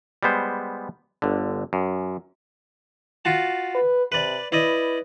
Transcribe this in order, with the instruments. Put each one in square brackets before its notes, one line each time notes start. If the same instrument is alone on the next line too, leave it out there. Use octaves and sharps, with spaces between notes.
[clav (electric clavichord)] G3 G#3 B3 C5
G1 D3
F#2
[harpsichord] F4 F#4 A5
[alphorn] B4
[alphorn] C3 [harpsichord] B4 D5
[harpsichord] E4 D5 D#5 [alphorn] B4